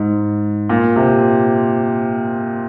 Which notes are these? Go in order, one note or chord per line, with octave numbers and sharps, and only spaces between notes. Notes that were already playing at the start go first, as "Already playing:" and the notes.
Already playing: G#2
A#2
C3